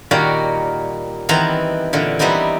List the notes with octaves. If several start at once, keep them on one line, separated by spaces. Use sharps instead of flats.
A#2 D#3 G3 A#3 F#4
D#3 E3 B3 C4 A#5
A#2 D3 E3
E3 G3 B3 C4 D#4 E4